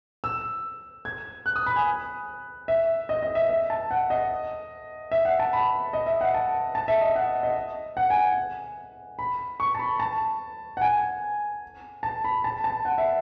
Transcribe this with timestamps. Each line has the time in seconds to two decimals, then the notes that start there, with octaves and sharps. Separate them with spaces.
0.24 E6
1.05 G#6
1.46 F#6
1.56 D#6
1.66 B5
1.76 G#5
2.68 E5
3.09 D#5
3.22 D#5
3.35 E5
3.49 E5
3.70 A5
3.91 F#5
4.10 D#5
5.11 E5
5.25 F#5
5.39 A5
5.53 B5
5.93 D#5
6.06 E5
6.21 F#5
6.34 A5
6.75 A5
6.88 E5
7.01 D#5
7.16 F#5
7.43 D#5
7.97 F#5
8.10 G#5
9.19 B5
9.60 C#6
9.75 A5
9.79 B5
10.00 A5
10.77 F#5
10.81 G#5
12.03 A5
12.24 B5
12.44 A5
12.64 A5
12.85 F#5
12.98 E5